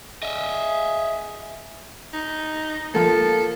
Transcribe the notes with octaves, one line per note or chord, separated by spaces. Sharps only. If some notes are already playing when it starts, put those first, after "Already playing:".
G#4 D#5 E5
D#4
F3 A#3 A4